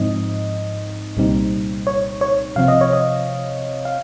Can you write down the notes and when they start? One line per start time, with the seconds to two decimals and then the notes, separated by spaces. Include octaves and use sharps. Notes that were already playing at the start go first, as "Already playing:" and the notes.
Already playing: G#2 F3 C4 D#4 D#5
1.17 C2 A#2 G3 C4 D#4
1.87 C#5
2.21 C#5
2.56 C3 F3 C4 F5
2.68 D#5
2.81 C#5
2.93 D#5
3.85 F5